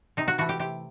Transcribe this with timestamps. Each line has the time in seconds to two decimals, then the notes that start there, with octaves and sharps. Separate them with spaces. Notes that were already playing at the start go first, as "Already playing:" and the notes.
0.17 C3 D#4
0.28 F#4
0.38 E3 A3 F#4
0.49 G4
0.59 C3 G4